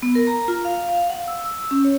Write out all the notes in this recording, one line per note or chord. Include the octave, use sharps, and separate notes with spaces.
B3
A#4
A#5
F4
F5
F5
F#5
E6
E6
C#4
C#5